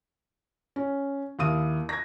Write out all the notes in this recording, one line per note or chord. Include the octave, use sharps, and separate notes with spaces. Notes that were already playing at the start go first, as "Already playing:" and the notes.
C#4
D#2 E4 F5 D#6 D#7
G#6 A#6